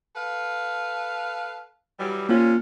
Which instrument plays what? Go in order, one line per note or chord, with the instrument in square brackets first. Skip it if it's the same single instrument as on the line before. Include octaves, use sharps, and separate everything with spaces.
[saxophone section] A4 B4 F5
E3 F#3 G3
[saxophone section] C3 G3 C#4 [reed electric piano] A#3 F4